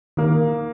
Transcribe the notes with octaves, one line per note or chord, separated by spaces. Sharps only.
D#3 A#3